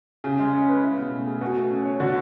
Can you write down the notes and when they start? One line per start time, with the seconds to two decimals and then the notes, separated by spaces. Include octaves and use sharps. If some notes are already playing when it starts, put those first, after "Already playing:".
0.24 C#3 G#4
0.39 G#3
0.53 C#4
0.68 B4
0.83 E4
0.98 B2
1.12 A3
1.27 G#4
1.41 B2 F#4
1.56 A3
1.70 C#4
1.85 C#5
2.00 D3 F#4